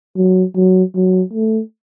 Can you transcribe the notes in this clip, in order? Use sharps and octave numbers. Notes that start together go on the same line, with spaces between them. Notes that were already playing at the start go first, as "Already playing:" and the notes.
F#3
F#3
F#3
A3